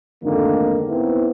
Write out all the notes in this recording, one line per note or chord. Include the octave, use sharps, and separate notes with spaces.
F2 G#2 D3 D#3 A3 A#3
B3 C4 E4